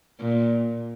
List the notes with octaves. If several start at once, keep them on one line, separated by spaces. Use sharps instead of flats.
A#2